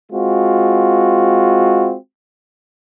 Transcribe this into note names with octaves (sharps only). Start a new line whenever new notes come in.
G#3 C4 F4 F#4